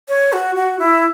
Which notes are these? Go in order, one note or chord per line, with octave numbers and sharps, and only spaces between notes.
C#5
F#4
F#4
E4